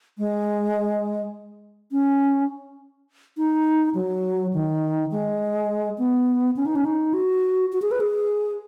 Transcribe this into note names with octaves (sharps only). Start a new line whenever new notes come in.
G#3
C#4
D#4
F#3
D#3
G#3
B3
C#4
D#4
C#4
D#4
F#4
F#4
G#4
B4
G#4